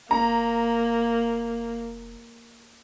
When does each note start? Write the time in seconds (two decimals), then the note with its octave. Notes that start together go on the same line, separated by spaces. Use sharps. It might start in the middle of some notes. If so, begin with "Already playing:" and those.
0.11 F1 A#3 A#5